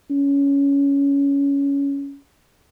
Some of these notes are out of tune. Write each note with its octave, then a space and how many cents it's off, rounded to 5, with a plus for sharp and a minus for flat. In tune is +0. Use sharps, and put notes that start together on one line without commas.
C#4 +15